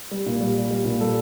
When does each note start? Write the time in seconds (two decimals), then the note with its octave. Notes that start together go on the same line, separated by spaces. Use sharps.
0.11 G3
0.26 A#2
0.41 G3
0.56 G3
0.71 G3
0.85 A#2
1.00 G3 A4